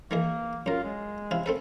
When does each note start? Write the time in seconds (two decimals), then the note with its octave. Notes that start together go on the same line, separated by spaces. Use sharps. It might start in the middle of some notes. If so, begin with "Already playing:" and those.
0.11 D#3 E3 A#3 G#4
0.66 F#2 F4 A#4
0.84 G#3
1.31 C3 E4 F5
1.46 C4 A4 B4